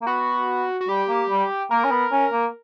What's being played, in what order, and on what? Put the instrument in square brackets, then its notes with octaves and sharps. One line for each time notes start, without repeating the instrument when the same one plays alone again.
[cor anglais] A#3
[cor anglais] B3 [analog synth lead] F#4
[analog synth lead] F#4
[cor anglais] G3 [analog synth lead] G4
[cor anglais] A#3
G3
[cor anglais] A#3 [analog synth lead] A#4
[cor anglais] C#4
B3
C#4
A#3